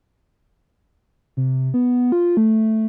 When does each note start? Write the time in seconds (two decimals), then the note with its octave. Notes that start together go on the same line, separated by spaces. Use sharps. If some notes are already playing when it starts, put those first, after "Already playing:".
1.37 C3
1.74 B3
2.12 F4
2.37 A3